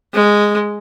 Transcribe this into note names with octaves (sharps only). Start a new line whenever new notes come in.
G#3